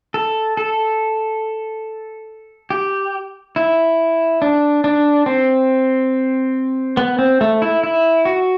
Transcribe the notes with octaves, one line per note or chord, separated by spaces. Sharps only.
A4
A4
G4
E4
D4
D4
C4
B3
C4
A3
E4
E4
F#4